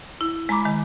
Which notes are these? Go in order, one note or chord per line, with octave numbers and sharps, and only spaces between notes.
E4
G#3 A#5 B5 D6
D#3 G#3